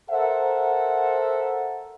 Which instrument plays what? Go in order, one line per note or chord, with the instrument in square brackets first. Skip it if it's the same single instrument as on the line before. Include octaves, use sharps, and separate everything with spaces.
[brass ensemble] A4 A#4 C5 E5 F#5